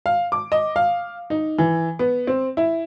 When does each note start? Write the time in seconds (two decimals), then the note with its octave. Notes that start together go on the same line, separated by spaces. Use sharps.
0.06 F5
0.32 D6
0.52 D#5
0.76 F5
1.30 D#4
1.58 E3
1.99 B3
2.27 C4
2.57 E4